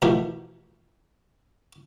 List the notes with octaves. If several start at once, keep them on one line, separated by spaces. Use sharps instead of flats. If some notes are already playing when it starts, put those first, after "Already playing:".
B2 E3 F3 A3 G4 A#4